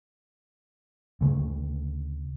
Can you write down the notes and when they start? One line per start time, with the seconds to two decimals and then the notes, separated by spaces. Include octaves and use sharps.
1.21 D2 C#3 G#3 A3